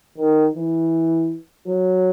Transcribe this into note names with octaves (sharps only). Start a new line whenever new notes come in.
D#3
E3
F#3